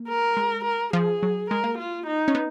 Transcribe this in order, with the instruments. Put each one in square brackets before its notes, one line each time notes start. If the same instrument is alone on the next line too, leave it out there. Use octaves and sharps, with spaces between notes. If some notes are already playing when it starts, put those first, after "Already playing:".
Already playing: [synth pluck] A#3
[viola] A#4
[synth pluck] G#3
[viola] A#4
[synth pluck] F3 [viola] G#4
[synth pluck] F#3
[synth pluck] G#3 [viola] A#4
[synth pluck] A#3
[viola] F4
D#4
[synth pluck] C#4
B3